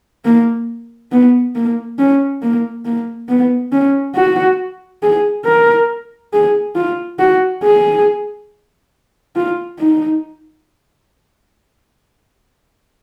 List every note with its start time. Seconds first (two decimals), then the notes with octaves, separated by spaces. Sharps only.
0.25 A#3
1.12 B3
1.55 A#3
1.99 C#4
2.42 A#3
2.85 A#3
3.29 B3
3.72 C#4
4.15 F#4
5.03 G#4
5.45 A#4
6.33 G#4
6.75 F4
7.19 F#4
7.63 G#4
9.36 F4
9.79 D#4